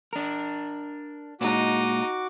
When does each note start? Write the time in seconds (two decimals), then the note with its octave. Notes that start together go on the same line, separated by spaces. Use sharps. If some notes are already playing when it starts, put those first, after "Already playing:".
0.13 D4 A#4
1.41 A#2 G#3 D#4 F#4 D6